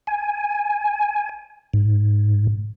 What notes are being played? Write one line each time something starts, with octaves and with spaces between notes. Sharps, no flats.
G#5
G#2